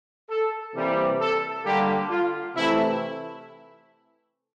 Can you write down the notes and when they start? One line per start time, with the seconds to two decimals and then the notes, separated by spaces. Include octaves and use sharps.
0.29 A4
0.74 C3 E3 G3 A#3
1.20 A4
1.64 D3 G3 A#3 G4
2.10 F4
2.55 C3 E3 A3 E4